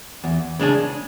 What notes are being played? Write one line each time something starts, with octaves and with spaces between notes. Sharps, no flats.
E2
C#3 G#3 D4 G#4